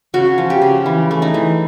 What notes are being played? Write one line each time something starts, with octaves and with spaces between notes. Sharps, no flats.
C#3 F#4
F3
G4
C#3
E3
A3
D#4
E3